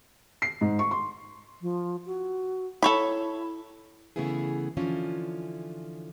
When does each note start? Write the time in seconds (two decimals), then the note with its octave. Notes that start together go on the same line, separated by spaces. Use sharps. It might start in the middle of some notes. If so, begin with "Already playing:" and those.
0.42 C7
0.61 G#2
0.79 C#6
0.91 C6
1.62 F3
2.06 F#4
2.83 E4 A4 C#5 B5
4.16 C#3 E3 A3 B3 E4 G#4
4.77 D3 E3 F3 C#4 F4